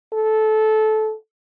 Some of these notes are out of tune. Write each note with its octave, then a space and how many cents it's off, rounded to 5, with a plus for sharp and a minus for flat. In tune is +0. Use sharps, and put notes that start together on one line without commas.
A4 -20